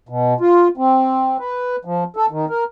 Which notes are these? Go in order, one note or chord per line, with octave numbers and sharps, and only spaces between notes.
B2
F4
C4
B4
F3
A4
D#3
A#4